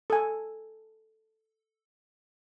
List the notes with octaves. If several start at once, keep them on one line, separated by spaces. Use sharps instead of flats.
A4 G#5